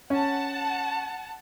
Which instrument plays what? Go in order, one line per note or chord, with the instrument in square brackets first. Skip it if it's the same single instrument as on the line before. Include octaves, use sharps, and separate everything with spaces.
[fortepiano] C#4 [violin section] F#5 A5